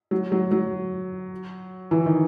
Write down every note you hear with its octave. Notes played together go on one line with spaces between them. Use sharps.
F#3
F#3
F#3
E3
D#3